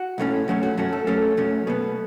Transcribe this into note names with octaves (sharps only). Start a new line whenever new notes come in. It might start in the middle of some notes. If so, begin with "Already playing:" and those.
Already playing: F#4
B1 A2 A3 C#4
F#2 F#3 A3 C#4
F#4
F#2 F#3 A3 C#4 F#4
A4
F#2 F#3 A3 C#4 A4
F#2 F#3 A3 C#4
B2 B3